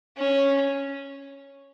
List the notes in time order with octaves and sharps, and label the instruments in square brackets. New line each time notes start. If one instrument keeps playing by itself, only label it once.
[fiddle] C#4